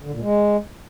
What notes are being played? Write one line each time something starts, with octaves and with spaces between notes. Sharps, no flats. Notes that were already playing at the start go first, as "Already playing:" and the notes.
D3
A#2
G#3